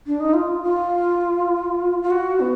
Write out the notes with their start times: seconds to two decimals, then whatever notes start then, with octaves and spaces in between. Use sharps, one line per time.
0.07 D4
0.20 D#4
0.34 F4
0.63 F4
2.03 F4
2.11 F#4
2.40 B3